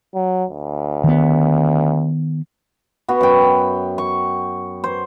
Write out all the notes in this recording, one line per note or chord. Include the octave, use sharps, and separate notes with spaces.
F#3
D2
D#3 B3
B3 F#4
F#2 G5
C#6
C5